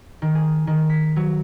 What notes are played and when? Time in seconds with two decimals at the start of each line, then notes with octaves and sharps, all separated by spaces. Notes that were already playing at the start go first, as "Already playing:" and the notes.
0.22 D#3
0.35 G#4
0.67 D#3
0.90 B6
1.16 F#3